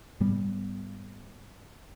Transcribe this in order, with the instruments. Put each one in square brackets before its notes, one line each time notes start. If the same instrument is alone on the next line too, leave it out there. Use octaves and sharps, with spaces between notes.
[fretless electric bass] G#2 G3 B3